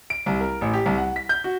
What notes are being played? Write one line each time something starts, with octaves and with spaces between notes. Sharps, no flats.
D7
C2
A#4
A1
G4
C2
F#5
B6
G6
F#4